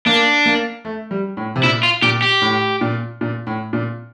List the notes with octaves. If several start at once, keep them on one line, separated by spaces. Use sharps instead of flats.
A#3 D4
A#3
A3
G3
A2
C3
A#2 E4
F4
A#2 G4
G4
A2
A#2
A#2
A2
A#2